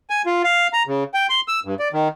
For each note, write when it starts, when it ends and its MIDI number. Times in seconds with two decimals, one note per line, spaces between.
0.10 0.22 80
0.26 0.42 65
0.44 0.67 77
0.73 0.83 82
0.87 1.04 49
1.14 1.27 79
1.30 1.41 84
1.48 1.60 88
1.65 1.75 43
1.79 1.88 74
1.93 2.08 51